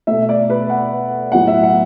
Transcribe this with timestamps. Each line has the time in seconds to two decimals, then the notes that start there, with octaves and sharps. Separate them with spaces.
0.07 B2 A3 E5
0.29 D5
0.50 B4
0.70 F#5
1.32 A2 F#3 B3 F#5
1.48 E5
1.63 F#5